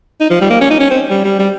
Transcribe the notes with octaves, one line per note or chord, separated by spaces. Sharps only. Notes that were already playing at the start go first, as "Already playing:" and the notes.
D#4
F3
G3
A#3
C#4
D#4
C#4
C4
G3
G3
G3